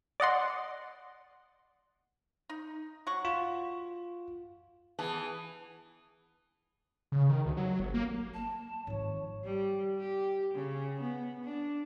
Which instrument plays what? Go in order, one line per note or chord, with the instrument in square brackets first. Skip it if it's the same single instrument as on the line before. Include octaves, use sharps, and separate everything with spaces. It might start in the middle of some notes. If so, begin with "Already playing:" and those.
[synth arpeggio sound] D5 D#5 F#5 C6
[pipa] D#4
F#3 F#5 C#6
[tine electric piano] F4
[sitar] E3 [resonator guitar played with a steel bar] B3 G#4 A5
[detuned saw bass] C#3
D#3
D2
F#3
G1
A#3
[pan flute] A5
[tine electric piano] G#1 [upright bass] G#2 F3 [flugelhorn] C#5
[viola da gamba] G3
G4
C#3
B3
D4